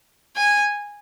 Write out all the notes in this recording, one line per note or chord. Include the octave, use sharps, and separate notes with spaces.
G#5